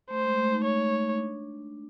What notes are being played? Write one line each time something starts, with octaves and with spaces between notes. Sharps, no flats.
A3 C5
G#3
A3
D#4
C#5
D4